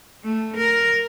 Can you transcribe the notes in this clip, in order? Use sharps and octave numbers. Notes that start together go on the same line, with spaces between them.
A3
A#4